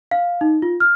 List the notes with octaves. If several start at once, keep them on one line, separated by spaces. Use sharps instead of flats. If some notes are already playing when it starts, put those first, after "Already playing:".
F5
D#4
F4
F6